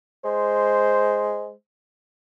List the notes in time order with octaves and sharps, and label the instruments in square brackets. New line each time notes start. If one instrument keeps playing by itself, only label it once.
[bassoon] G#3 [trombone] C5